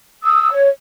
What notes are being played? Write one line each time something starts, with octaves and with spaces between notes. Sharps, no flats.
D#6 E6
C#5